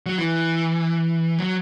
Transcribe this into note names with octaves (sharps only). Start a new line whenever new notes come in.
F#3
E3
F#3